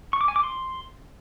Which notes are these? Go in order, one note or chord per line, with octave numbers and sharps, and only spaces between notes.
C#6
D6
G#5
D6
C6